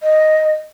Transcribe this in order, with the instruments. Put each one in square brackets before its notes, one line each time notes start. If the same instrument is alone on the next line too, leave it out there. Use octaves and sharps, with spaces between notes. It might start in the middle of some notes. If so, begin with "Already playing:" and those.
[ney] D#5